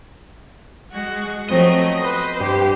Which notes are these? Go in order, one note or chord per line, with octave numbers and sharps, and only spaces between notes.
G#3 F#4
F3 F#3 A3 B3 C4 D#5
B4 C5
G2 G4